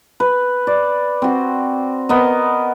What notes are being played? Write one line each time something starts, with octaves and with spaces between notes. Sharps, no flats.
B4
D5
C4 F#4
B3 A#4 D#5